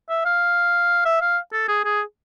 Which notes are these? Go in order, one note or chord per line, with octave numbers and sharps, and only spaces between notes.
E5
F5
E5
F5
A4
G#4
G#4